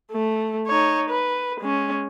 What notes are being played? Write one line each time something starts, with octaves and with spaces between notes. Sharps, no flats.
A3
D#4 C#5
B4
G#3 C#4